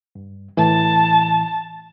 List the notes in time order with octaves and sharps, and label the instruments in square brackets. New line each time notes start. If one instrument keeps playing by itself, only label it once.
[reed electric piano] G2
[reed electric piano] A2 E3 [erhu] A5